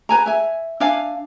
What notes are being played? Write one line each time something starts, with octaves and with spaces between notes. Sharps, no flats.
B4 G#5 A#5
E5 G#5
D4 E5 F5 G#5